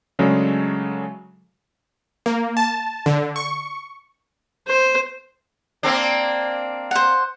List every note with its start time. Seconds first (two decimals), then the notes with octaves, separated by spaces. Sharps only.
0.19 C#3 F#3 G#3 A3 D4
2.26 A#3
2.57 A5
3.06 D3
3.36 C#6
4.67 C5
5.83 A#3 C4 D4
6.91 C5 F#5